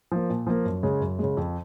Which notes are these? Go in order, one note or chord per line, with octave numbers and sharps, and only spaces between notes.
F3 A#3
A#2
F3 A#3
F#2
C#3 G#3
F#2
C#3 G#3
F2